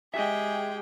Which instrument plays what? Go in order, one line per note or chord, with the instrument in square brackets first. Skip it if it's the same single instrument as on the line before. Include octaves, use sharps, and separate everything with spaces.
[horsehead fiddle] G#3 G4 [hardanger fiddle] G#4 G5 [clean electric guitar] D#5 E5